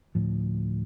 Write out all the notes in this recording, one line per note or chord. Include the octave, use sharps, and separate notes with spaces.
D2 A2 F3